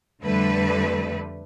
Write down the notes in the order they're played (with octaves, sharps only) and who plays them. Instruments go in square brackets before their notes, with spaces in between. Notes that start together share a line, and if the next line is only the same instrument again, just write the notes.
[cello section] F2 D3 G3 A3 B4